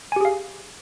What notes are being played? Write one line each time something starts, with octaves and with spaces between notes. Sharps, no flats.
G4 G#4 F5 G#5